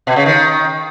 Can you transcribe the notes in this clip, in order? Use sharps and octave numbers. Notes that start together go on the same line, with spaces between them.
B2
C#3
D#3